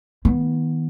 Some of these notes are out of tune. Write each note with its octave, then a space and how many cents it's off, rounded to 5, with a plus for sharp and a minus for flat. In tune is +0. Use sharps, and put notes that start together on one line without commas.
D#3 +25 B3 -20